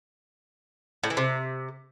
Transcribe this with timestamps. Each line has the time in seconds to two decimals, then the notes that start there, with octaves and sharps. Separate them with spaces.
1.03 A2
1.10 E3
1.17 C3